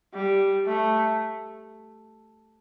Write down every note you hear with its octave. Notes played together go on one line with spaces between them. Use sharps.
G3
A3